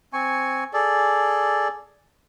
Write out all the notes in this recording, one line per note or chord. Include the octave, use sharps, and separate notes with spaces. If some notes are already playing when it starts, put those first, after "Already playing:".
C4 G#5 C#6
G#4 A4 D5